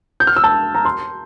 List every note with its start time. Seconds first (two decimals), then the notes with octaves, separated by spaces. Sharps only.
0.20 G6
0.27 F6
0.36 E6
0.44 A5
0.75 A#5
0.85 C6